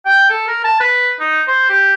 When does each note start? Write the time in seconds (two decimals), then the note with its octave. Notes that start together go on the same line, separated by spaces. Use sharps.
0.05 G5
0.30 A4
0.48 A#4
0.64 A5
0.80 B4
1.20 D#4
1.47 C5
1.69 G4